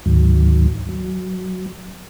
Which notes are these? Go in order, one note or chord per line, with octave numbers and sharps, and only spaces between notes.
D2 G#2 D#3 F#3
F#3